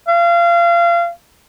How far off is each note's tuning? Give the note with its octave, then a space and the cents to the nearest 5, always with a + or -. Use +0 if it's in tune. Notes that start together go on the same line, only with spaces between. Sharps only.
F5 -30